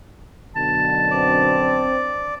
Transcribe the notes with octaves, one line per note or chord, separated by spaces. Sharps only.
F#2 B2 D3 A5
C4 D5